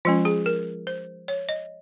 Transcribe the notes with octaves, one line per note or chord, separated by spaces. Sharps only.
F3 G#3 C#4 F4
G#4
A#4
C5
C#5
D#5